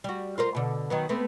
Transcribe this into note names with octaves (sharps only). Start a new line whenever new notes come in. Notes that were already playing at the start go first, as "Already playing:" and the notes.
G3 F#4
F4 A#4 C5
B2 D3
D#3 F#3 B3
A3 B3 C4